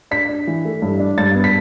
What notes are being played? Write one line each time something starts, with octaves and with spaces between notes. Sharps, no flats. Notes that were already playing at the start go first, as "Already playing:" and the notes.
D4 B6
D4
E3
A3
G2
D4
G2 A6
B3
B6